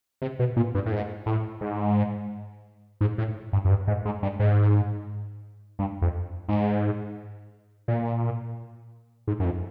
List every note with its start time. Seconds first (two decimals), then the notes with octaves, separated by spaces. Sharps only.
0.22 C3
0.39 B2
0.56 A#2
0.75 G2
0.86 A2
0.92 G#2
1.26 A2
1.61 G#2
3.01 G#2
3.18 A2
3.53 G2
3.65 F#2
3.69 G2
3.87 G#2
4.05 G#2
4.23 G2
4.39 G#2
5.79 G2
6.02 F2
6.48 G#2
7.88 A#2
9.28 G#2
9.40 F#2
9.45 F2